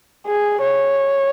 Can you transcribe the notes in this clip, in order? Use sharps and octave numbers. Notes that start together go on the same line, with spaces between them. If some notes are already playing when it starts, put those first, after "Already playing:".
G#4
C#5